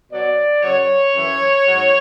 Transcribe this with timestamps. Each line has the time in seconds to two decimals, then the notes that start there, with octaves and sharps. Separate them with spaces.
0.11 B2 F#3 D5
0.62 F#2 C#3 F#3 C#5
1.14 F#2 E3
1.65 G#2 F#3